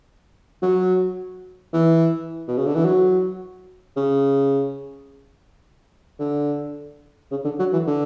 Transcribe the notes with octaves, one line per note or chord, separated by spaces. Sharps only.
F#3
E3
B2
C#3
D3
E3
F#3
C#3
D3
C#3
D3
F#3
E3
D3